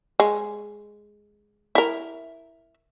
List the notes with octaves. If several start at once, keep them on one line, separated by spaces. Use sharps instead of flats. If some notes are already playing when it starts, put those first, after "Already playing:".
G#3
E4 A#4